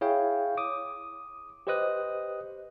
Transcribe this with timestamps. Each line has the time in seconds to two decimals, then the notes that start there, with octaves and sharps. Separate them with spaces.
0.01 E4 G#4 C#5 F5 G5
0.57 D6 D#6
1.67 G4 B4 C5 D#5 D#6 F#6